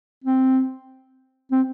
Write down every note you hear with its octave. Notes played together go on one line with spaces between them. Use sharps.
C4
C4